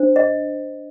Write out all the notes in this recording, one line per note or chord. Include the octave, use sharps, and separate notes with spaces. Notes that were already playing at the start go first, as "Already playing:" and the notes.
Already playing: D4 C5
D#5